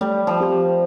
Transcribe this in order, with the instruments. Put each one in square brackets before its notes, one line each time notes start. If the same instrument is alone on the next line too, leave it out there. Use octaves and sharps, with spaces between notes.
[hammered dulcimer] G3 [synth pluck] A3
[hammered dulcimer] F3
[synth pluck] C4 G4 C5